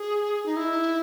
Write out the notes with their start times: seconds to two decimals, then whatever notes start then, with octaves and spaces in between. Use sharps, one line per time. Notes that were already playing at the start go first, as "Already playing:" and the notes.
Already playing: G#4
0.46 D#4
0.56 E4